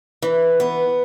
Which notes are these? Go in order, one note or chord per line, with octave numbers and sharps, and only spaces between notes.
E3
B3